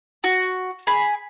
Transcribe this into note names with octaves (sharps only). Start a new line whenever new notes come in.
F#4
G#4 B5